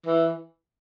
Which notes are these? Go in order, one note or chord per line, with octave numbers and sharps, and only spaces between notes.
E3